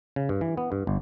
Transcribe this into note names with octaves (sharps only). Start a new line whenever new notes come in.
C#3
G2
E3
B3
G2
G1